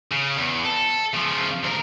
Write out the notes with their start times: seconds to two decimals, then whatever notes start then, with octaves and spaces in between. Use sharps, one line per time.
0.12 C#3
0.37 E2
0.65 A4
1.14 C#3 F3
1.63 D2 A#4